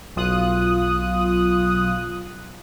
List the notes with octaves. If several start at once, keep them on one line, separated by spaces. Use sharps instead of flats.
B1 F4 D#6 F#6